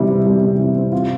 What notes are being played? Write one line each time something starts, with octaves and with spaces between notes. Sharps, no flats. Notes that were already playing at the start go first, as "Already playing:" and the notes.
Already playing: C3 E3 G3
C4
G3
C3
E3
C4
F4